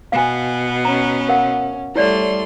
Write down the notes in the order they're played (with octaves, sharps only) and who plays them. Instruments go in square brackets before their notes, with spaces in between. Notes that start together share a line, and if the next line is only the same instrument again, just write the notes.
[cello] B2 B3 [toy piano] F5 G#5
[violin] C#4 [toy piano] A#5
[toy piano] A#4 F5 F#5
[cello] G3 [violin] A3 C6 [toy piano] E4 C#5 D5